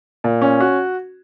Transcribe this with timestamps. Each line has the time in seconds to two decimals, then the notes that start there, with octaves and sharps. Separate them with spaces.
0.24 A#2
0.42 C#4
0.60 F#4